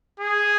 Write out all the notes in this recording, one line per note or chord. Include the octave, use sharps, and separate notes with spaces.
G#4